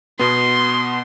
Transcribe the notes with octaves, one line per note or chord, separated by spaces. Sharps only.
B2 B3 C6